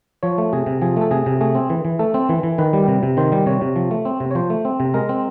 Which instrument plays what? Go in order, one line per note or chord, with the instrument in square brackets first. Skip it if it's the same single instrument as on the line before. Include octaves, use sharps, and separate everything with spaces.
[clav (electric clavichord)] F3 C#5
A3
C3 G#4
C3
F3 G#4
A3 A4
C3 G#4
C3
A3 G#4
C4
E3
E3
A3 A4
C4
E3
E3
D#3 B4
G3
C3
C3
D#3 C5
G3
C3 C#5
C3
F3
A3
C4
C3
C#5
F3 C5
A3
C4
C3
G#3 A#4
C4